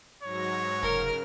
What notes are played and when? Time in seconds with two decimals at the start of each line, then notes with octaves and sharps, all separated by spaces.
0.23 G#2 F#3 C#5 A#6
0.83 F1 C#3 A#4 F6